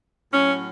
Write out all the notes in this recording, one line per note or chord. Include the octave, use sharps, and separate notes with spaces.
A2 F#3 C#4